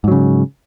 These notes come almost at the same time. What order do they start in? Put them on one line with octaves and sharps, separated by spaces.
G#2 F#3 C#3